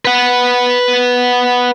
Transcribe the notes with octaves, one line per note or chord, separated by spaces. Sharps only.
B4 F#5